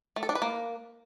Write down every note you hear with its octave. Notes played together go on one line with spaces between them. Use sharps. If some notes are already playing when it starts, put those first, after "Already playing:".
A3
A4
D4
B4
A#3